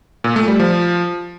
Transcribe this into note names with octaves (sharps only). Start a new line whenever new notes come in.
A#2
A3
G3
F3